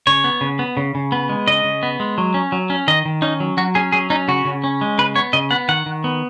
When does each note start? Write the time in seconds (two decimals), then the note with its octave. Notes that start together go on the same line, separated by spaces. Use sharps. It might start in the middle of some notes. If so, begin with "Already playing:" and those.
0.07 C#3 C#5
0.24 B3
0.41 C#3
0.59 B3
0.77 C#3
0.95 C#3
1.12 B3
1.29 G#3
1.47 C#3 D#5
1.64 C#3
1.83 B3
2.00 G#3
2.18 F#3
2.34 C#4
2.52 F#3
2.70 C#4
2.88 D#3 D#5
3.05 D#3
3.22 C#4 D#4
3.40 F#3
3.57 F#3 F#4
3.75 C#4 G#4
3.92 F#3 G#4
4.10 C#4 D#4
4.28 C#3 F#4
4.45 C#3
4.64 C#4
4.81 G#3
4.98 C#3 B4
5.15 B3 C#5
5.33 C#3 D#5
5.51 B3 F#5
5.69 D#3 F#5
5.86 D#3
6.04 B3